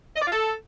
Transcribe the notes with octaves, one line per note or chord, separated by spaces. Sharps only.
D#5
D5
F4
A4